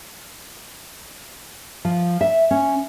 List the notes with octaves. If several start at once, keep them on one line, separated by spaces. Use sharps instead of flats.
F3
E5
C#4